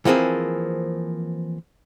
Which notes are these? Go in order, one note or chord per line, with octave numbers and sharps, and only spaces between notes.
E3 F3 A#3 C4 G#4